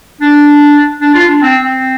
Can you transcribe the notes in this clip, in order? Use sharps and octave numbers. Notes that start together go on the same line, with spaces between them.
D4
D4
F4
D4
C4
C4